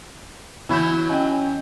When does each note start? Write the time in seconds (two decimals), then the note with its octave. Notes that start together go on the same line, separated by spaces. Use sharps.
0.69 E3 F#3 E4 G6
1.09 C#4 D#5 G5 G#5